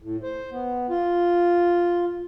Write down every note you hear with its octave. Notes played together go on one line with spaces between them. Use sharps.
A2
C5
B3
F4